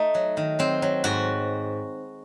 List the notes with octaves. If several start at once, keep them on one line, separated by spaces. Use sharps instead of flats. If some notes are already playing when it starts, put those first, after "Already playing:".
Already playing: A3 D#4
F#3
D#3
F#3 C4
F#3
G#2 F#4